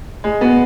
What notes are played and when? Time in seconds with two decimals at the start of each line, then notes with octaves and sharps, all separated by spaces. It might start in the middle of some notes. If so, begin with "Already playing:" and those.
0.24 G#3
0.41 B3 F#4